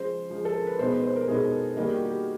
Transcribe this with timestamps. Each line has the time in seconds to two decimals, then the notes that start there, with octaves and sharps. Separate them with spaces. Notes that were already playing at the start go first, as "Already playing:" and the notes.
Already playing: C#3 F3 G#3 C5
0.30 C#3 F3 G#3
0.45 A4
0.56 A#4
0.67 B4
0.78 B2 G#3 B3 D#4 C5
0.91 B4
1.04 C5
1.16 A#4
1.28 B2 G#3 B3 D#4 G#4
1.44 A4
1.77 D#3 G3 A#3 D#4 G#4
1.87 G4
1.96 F#4
2.05 G4